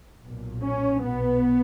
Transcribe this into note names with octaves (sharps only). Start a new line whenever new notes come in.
B1 A#2
C#4
B1 B2 B3